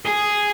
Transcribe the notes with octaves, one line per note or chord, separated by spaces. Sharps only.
G#4